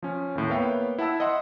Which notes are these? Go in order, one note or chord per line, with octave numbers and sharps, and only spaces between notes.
F3 C#4
D#2 A2
A#3 B3 C#5 E5 F5 G5
E4 F#5 A5 E6
D#5 E5 F#5 C6